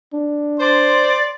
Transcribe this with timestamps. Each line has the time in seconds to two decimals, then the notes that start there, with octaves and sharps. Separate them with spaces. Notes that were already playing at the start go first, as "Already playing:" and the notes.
0.14 D4
0.60 C5 D5 C6